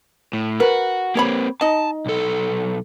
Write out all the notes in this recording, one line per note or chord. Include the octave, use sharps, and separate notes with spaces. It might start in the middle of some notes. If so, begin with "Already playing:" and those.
A2
F#4 A#4 B4
A#3 C4 G4 C#5 B5
D#4 D#5 A5
B1 A4